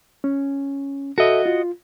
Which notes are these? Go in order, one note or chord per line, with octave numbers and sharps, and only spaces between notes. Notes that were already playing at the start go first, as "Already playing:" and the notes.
C#4
F#4 A4 D#5 E5
F4